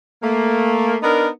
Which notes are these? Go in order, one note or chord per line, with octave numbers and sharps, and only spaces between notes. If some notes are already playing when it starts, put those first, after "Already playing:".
A3 A#3
B3 D4 D#4 A#4